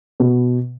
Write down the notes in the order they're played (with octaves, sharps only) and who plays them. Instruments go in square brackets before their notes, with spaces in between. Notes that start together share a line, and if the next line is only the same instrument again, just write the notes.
[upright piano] B2